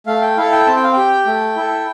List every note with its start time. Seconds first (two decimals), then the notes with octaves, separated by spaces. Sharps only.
0.07 A3 F5
0.22 G5
0.37 E4 A4 F5
0.52 G5
0.67 C4 A5
0.76 G5
0.84 F5
0.93 G4 G5
1.26 A3
1.56 E4 A4